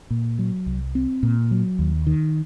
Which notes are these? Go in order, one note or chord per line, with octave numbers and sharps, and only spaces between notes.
A#2
F#3
C2
C4
A#2
F#3
D#2
D#3